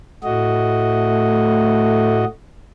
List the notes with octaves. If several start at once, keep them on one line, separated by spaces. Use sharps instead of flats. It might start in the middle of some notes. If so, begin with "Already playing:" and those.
A2 A3 F#4 D#5